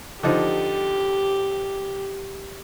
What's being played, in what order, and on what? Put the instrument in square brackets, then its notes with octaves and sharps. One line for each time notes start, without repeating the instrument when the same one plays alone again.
[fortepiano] D3 F3 D#4 [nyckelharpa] G4